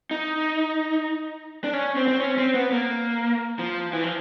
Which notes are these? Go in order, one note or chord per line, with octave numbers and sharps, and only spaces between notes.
D#4
D4
C#4
C4
C4
C#4
C4
B3
A#3
F3
E3
F3